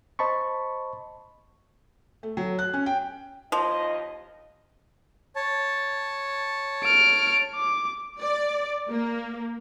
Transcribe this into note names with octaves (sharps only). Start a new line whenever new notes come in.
C5 D#5 A5 B5 C#6
A3
F#3
F#6
C#4
G5
D#2 F3 D#5
C#5 A5
F6 D7
D6
D5
A#3